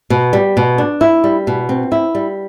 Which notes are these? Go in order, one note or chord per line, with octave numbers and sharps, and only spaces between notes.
B2
G3
B2
D4
E4
G3
B2
C4
E4
G3